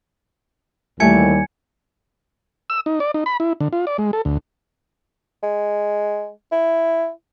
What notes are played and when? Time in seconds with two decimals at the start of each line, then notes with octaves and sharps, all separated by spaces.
1.00 D#2 E3 G3 A3 E5 G#5 G#6 C#7
2.70 E6
2.86 D#4
3.00 D5
3.14 D#4
3.26 B5
3.40 E4
3.60 D3
3.73 F4
3.87 D5
3.98 G#3
4.13 A4
4.25 D2
5.43 G#3
6.52 E4